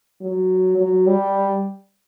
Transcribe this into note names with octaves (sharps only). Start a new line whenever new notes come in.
F#3
F#3
G3